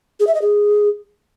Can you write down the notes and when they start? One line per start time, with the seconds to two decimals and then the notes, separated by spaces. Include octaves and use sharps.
0.20 G#4
0.27 E5
0.34 D#5
0.42 G#4